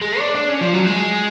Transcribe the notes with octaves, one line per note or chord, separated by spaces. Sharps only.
G#3
D4
D4
C#4
F3
F#3
G#3